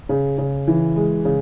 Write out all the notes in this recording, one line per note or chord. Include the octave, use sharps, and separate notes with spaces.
C#3
C#3
E3
G#3
C#3